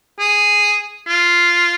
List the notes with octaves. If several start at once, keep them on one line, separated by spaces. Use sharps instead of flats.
G#4
F4